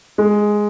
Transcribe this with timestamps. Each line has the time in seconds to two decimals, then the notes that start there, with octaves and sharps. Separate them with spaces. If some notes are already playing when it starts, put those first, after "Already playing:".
0.18 G#3